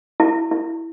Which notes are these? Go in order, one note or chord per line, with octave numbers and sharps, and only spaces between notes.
E4
E4